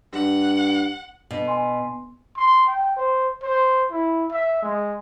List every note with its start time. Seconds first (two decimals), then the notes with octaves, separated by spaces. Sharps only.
0.13 G2 F#5
1.31 B2
1.48 G#5 C6
2.37 C6
2.67 G5
2.97 C5
3.43 C5
3.91 E4
4.31 E5
4.63 G#3